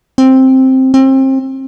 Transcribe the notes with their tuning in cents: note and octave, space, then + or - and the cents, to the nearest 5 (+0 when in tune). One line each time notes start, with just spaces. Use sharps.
C4 +5
C4 +30